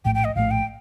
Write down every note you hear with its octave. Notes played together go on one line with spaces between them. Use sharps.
A#1 A2 A3 G5
G5
D#5
A#1 A2 A3 F5
G5